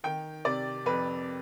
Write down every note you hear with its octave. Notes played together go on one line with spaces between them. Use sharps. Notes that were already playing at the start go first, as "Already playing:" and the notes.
D#3 G5
C3 D5
F2 B4